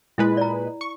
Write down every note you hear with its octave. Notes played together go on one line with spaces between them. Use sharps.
A#2 G#3 E4 B4
D5 A#5
C#6